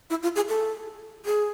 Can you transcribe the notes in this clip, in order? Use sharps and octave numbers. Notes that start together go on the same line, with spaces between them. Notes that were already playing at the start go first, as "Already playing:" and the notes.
E4
F4
G#4
A4
G#4